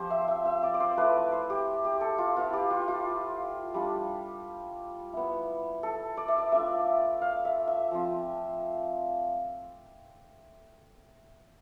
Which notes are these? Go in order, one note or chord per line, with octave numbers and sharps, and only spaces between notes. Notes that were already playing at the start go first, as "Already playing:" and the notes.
Already playing: F3 C4 F4 G4 C5
E5
E5
E5
D5
D5
C5
A3 E4 B4
C5
G4
G4
A4
F4
B3 E4 F4
G4
F4
F4
G3 D4 F4
B3 E4
A4
D5
E5
D5
A3 D4 F4 E5
F5
E5
E5
F3 C4 F4